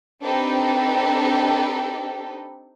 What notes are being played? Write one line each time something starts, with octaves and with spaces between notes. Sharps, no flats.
C4 D4 D#4 G4 A4 B4